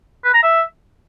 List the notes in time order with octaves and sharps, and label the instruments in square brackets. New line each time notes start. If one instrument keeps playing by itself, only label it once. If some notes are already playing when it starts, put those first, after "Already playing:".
[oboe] B4
A#5
E5